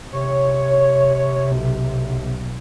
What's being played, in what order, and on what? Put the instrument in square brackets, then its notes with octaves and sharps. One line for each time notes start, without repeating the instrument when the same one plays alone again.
[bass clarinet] C3 [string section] C#5
[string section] B1